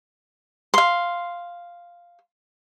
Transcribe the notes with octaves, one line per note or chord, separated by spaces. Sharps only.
F5 C6